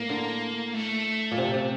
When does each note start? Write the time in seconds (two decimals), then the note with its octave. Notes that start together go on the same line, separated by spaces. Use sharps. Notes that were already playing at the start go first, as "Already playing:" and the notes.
Already playing: A2 A#3
0.10 D3
0.74 A3
1.32 A#2
1.38 C3
1.54 C3